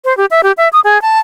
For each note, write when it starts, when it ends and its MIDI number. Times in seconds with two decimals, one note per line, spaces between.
0.05 0.16 72
0.17 0.26 67
0.31 0.41 76
0.43 0.52 67
0.57 0.69 76
0.73 0.80 87
0.84 1.01 68
1.02 1.19 81